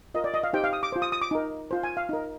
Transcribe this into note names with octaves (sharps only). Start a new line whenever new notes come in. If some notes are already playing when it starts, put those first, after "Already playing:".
F4 A#4 D#5
D5
D#5
F5
D#4 G4 C5 G5
F5
D#6
D6
F4 C5
D#6
D#6
D6
D#4 A#4
F4 C5
G#5
F5
D#4 A#4